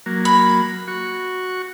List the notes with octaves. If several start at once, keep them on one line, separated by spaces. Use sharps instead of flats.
F#3 A#3
B5
F#4 C#6